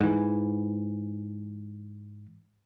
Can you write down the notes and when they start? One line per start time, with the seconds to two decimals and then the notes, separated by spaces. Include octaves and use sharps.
0.01 G#2 E3